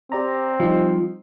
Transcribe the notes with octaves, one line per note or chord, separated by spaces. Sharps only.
C4 G4 D5 A#5
F3 G3 D#4